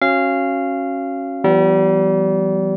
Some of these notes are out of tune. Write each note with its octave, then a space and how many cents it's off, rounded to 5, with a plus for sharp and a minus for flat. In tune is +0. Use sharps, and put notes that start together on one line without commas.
C#4 -20 F#4 +0 F5 -15
E3 +35 G3 -30 B3 +0